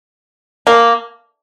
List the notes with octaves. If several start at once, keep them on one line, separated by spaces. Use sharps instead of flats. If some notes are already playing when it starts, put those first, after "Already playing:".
A#3